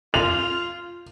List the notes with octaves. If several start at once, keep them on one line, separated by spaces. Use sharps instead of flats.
F4 F7